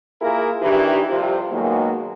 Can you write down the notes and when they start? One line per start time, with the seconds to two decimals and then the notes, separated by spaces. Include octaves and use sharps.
0.21 A#3 E4 F4 G#4 A#4
0.62 D#3 E3 D4 E4 G4
1.09 F2 C3 G3 F4 C5
1.51 B2 D#3 F#3 G#3 A#3